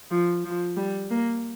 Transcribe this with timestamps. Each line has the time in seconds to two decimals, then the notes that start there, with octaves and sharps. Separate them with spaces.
0.11 F3
0.44 F3
0.77 G3
1.10 A#3